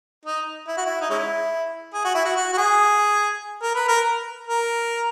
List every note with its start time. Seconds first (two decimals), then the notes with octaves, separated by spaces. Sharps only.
0.25 D#4
0.68 E4
0.77 F#4
0.86 E4
1.01 D#4
1.10 G#3 C#4 E4
1.94 G#4
2.05 F#4
2.15 E4
2.25 F#4
2.36 F#4
2.53 F#4
2.57 G#4
3.62 A#4
3.75 B4
3.88 A#4
4.47 A#4